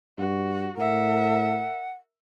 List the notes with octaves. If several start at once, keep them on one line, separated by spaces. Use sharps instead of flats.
G2 F#4
A2 A#4 E5 F#5